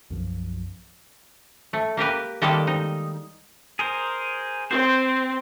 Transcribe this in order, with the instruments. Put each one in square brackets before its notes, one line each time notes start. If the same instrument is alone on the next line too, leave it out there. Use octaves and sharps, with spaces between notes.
[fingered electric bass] B1 F#2 F3
[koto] A3
A#3 G4 A#4 B4
D#3 G3 G#3 A#3 G4 A4
D#4
[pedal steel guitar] G#4 A#4 C5
[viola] C4 [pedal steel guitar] C5